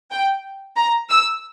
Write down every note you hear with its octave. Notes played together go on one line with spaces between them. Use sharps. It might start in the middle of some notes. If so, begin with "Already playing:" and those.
G5
A#5
E6